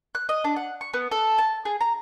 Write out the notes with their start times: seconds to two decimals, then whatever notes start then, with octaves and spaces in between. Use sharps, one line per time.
0.15 F#6
0.29 D#5
0.44 D4
0.56 F#5
0.81 C#6
0.94 B3
1.11 A4
1.38 A5
1.65 G#4
1.81 A#5